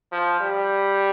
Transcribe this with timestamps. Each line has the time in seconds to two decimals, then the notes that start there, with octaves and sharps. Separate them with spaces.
0.12 F3
0.40 G3